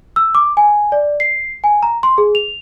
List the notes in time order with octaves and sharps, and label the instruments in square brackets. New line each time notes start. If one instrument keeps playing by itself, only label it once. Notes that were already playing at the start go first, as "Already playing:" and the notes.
[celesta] E6
D6
G#5
D5
C7
G#5
A#5
C6
G#4
F7